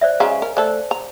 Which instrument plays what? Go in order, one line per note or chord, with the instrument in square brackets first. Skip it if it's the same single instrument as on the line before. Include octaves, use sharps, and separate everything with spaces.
[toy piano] C5 D5 E5
[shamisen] C#3 G#3 F#4 [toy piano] F5 G#5 A#5
[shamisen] A#4
[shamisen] A3 A4 [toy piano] C5 D5
[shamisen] A#5